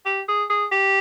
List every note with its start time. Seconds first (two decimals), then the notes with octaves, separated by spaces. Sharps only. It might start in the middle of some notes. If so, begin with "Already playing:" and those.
0.06 G4
0.28 G#4
0.50 G#4
0.72 G4